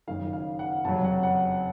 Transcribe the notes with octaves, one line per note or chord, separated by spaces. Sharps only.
F#1 F#2 D#3 F5
F5
F#5
F#1 F2 C3 F#3 A5
F#5
F#5